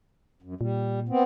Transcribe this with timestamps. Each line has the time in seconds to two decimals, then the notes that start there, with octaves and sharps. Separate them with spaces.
0.42 F#2
0.61 A#2 G3
1.09 B3 C4